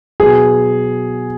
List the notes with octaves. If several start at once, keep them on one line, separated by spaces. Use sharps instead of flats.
B2 F#3 B3 G#4